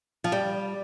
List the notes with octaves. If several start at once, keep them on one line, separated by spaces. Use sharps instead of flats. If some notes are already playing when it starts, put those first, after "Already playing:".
F3
G3